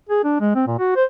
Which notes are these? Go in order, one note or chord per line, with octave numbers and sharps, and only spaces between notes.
G#4
D4
G#3
C4
A#2
F#4
C5